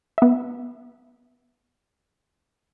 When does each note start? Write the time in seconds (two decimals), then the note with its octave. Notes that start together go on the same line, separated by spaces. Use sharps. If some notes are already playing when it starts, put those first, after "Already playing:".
0.18 B3 E5